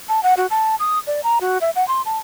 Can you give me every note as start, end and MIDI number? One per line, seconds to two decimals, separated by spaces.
0.09 0.23 81
0.23 0.34 78
0.37 0.47 66
0.51 0.76 81
0.80 0.99 87
1.07 1.21 74
1.24 1.39 82
1.41 1.58 66
1.61 1.70 76
1.76 1.87 78
1.88 2.02 84
2.06 2.19 81